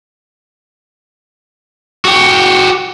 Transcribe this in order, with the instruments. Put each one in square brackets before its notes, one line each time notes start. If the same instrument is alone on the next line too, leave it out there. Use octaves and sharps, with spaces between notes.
[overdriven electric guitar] F#4 G4